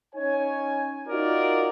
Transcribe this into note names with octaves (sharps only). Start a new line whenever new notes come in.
C#4 D#4 C#5 G#5
D#4 F4 F#4 A#4 D5